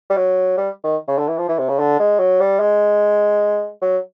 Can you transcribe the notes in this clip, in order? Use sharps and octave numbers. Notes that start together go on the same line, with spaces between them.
G3
F#3
G3
D#3
C#3
D3
E3
F3
E3
C3
C#3
D3
G#3
F#3
G3
G#3
F#3